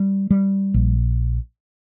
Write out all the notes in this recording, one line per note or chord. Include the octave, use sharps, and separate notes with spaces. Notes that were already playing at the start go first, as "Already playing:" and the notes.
Already playing: G3
G3
A#1